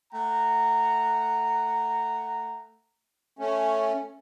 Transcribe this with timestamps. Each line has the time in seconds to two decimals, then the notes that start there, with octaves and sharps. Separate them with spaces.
0.13 A3 F#5 A#5
3.39 A3 C#4